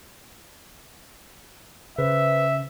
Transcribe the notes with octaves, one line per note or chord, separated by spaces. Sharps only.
C#3 B4 C5 E5